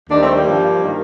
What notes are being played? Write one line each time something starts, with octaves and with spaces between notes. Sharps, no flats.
D#2 D#3 G3 A#3 D4
A3 C4
G3 A#3
G2 F3
D#3 G3